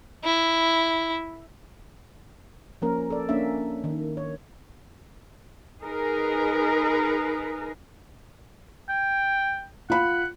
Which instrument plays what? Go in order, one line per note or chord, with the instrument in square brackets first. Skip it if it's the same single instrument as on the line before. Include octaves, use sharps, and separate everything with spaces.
[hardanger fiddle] E4
[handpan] F3 A#3 C#4 A#4
A4 D5
A#3 C#4 D4 E5
D#3
C#5
[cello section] D#4 G#4 A#4 B4
[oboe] G5
[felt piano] F4 B5 [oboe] F#5